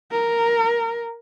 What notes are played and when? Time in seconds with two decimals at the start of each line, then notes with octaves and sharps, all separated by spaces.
0.11 A#4